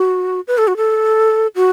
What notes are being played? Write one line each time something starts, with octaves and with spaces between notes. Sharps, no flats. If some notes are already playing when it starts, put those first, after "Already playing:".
Already playing: F#4
B4
A4
F#4
A4
F#4